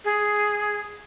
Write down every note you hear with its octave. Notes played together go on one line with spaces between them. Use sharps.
G#4